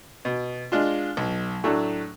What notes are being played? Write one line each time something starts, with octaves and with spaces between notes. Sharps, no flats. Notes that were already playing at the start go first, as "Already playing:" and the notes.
B2
G#3 D4 F4
B1
A2 F#3 A3 D4